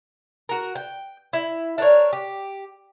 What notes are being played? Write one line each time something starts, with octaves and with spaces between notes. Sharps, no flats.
F#4 A#4
G5
E4
D4 A#4 C#5
G4